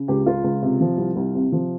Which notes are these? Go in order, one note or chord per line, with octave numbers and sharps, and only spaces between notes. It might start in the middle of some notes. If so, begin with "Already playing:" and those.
Already playing: C#3
C#2 G4
C#2 F4
C#2
C3
F3
C2
C2
C3
F3